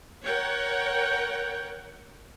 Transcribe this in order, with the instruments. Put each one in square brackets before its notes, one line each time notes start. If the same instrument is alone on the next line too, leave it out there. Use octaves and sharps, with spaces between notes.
[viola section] A#4 C#5 F#5 G5